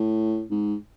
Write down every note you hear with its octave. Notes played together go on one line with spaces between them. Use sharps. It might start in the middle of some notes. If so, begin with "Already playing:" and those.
Already playing: A2
G#2